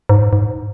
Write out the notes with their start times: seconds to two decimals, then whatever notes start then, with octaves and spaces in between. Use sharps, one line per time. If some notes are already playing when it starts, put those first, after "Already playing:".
0.09 G#2
0.33 G#2